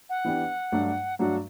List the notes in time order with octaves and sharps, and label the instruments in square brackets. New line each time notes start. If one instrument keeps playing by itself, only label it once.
[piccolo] F#5
[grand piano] E3 B3 D4 G4
G2 F#3 A3 D4 F#4
[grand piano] G2 F#3 A3 D4 F#4 [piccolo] F#5